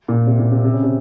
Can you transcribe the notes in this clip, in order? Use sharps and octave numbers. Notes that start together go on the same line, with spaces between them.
A#2
C3
A#2
C3
C3
C#3
C3